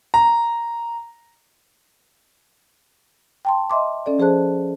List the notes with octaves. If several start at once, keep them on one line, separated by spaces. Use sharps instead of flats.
A#5
G5 A5 C6
D#5 E5 C6 D6
C#4 A4 D5
F3 G#4 C5 A5 F#6